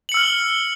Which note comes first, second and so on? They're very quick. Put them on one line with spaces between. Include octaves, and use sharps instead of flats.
F#7 C#7 E6 F6